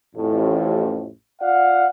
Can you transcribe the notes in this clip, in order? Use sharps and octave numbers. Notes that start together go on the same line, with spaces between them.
A1 F2 A2
F4 D5 F5 F#5